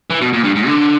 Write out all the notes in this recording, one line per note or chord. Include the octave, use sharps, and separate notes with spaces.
E3
B2
A#2
G2
G#2
D3